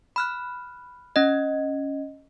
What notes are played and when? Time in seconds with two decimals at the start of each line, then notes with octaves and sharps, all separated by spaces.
0.16 B5 F6 F#6
1.16 C#4 D#5